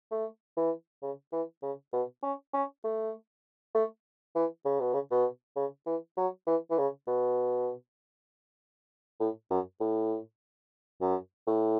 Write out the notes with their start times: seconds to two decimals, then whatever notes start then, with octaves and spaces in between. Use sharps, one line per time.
0.11 A3
0.57 E3
1.02 C#3
1.32 E3
1.63 C#3
1.93 B2
2.23 C#4
2.54 C#4
2.84 A3
3.75 A3
4.36 E3
4.65 C#3
4.80 B2
4.94 C#3
5.11 B2
5.56 C#3
5.87 E3
6.17 F#3
6.47 E3
6.71 E3
6.78 C#3
7.07 B2
9.20 A2
9.51 F#2
9.81 A2
11.01 F#2
11.47 A2